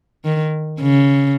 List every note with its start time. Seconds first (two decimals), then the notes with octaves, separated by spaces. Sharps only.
0.25 D#3
0.80 C#3